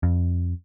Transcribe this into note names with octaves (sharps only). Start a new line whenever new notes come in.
F2